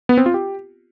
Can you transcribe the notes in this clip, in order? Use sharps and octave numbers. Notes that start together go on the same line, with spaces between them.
B3
C4
F4
G4